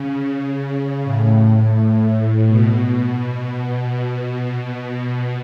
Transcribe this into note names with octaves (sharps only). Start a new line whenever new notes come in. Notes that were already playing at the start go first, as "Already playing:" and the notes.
Already playing: C#3
A2
B2